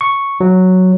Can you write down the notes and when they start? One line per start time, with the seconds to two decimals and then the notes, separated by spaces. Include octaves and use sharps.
0.01 C#6
0.41 F#3